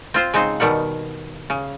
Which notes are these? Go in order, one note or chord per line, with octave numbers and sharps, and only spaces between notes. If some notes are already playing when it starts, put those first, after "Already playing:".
C4 F4 C5
C#3 G#3 C4 D#4 C5
B2 D#3 G3 F#5
C#3